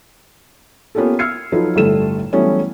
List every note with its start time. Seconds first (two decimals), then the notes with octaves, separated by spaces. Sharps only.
0.95 A#3 B3 C#4 F4 G4 A4
1.19 E6 F6 G#6 C7 C#7
1.52 F3 F#3 D#4 F4 A4 B4
1.76 G1 A2 G3 A3 A4 E7
2.33 E3 F#3 G3 A3 B3 C#4